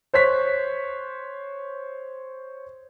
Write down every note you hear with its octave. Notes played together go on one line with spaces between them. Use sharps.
C5 C#5 F#6 B6